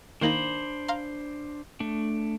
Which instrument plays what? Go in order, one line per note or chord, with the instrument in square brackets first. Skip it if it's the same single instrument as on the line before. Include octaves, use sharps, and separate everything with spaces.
[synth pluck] D#3 A#3 D#4 [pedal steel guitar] D4 C5 B5
[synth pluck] F5 A#5 C6
[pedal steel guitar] A3 D4